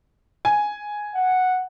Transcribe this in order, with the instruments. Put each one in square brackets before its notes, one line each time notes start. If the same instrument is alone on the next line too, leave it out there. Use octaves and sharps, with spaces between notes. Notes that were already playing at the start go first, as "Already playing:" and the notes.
[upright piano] G#5
[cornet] F#5